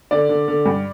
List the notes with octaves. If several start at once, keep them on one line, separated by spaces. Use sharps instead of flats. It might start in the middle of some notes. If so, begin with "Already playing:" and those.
D3 D5
D3
D3
G2